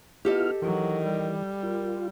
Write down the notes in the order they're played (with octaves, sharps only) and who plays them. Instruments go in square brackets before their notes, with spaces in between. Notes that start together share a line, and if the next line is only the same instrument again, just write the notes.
[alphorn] B3 [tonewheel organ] E4 F4 F6 [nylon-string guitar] G4 A4 D#5
[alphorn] D#3 [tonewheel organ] E3 [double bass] F#3
[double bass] G3
[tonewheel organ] F4 [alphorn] A#4